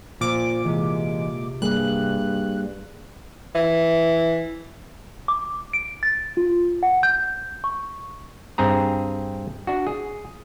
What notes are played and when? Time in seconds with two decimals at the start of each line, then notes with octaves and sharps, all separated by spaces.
0.21 A#2 F3 D6
0.65 C3 E3 G#3
1.62 G2 G3 A#3 G#4 F#6
3.55 E3
5.28 D6
5.73 D7
6.03 A6
6.37 F4
6.83 F#5
7.03 G6
7.64 C#6
8.58 G2 C4 G#4 A#5
9.67 D4 F#4
9.87 G#4